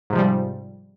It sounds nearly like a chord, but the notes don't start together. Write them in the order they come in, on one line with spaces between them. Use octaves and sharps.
G#2 C3 F3 G3